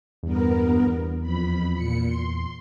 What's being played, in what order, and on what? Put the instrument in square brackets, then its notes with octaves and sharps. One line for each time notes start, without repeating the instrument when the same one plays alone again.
[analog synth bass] E2 [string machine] G2 B3 A#4
[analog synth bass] E2
[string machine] F2 B5
A#2 C#7
C6